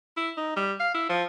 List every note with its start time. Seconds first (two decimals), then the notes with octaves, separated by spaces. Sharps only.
0.17 E4
0.37 D#4
0.57 G3
0.80 F5
0.94 E4
1.10 F3